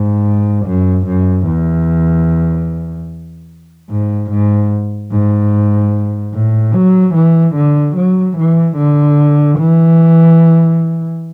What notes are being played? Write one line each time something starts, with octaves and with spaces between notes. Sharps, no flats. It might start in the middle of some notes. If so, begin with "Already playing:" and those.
Already playing: G#2
F#2
F#2
E2
G#2
G#2
G#2
A2
F#3
E3
D3
F#3
E3
D3
E3